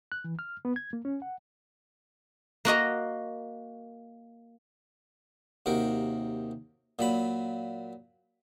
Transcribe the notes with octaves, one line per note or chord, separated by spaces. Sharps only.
F#6
E3
F6
B3
G#6
A#3
C#4
F#5
A#3 F#4 D#5 A#5
D#2 C3 F#4 A#4
A#2 F#3 B5